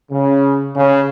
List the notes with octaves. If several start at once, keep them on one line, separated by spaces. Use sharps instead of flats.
C#3
C#3